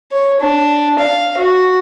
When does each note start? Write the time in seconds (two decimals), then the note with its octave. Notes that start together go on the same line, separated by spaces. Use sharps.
0.12 C#5
0.41 D4
0.99 F5
1.38 F#4